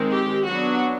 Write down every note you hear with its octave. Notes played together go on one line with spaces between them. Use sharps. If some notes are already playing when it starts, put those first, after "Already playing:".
Already playing: D#3 G#3 C4
G4
F#3 B3 D4 F#4